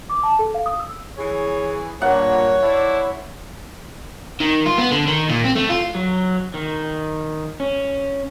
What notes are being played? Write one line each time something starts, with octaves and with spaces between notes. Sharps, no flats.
D6
A5
A4
F5
D#6
E6
E3 G#4 C#5
G2 A#2 A#3 C#5 F#5
E4 A4 C5 D5
D#3
F4
B3
D3
D#3
A#2
C4
A3
F4
F#3
D#3
C#4